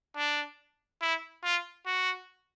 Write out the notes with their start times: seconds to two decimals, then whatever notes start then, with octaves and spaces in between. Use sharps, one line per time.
0.17 D4
1.02 E4
1.44 F4
1.86 F#4